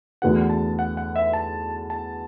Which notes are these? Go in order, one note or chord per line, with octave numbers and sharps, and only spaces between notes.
E2 D3 A3 F#4 B4 F#5
A5
F#5
F#5
E5
A5
A5